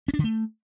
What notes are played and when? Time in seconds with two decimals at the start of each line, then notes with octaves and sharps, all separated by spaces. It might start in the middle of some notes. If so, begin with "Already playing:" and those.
0.08 C#4
0.14 D4
0.19 D3
0.24 A3